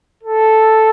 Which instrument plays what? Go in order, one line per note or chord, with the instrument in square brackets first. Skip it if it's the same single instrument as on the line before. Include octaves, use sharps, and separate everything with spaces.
[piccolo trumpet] A4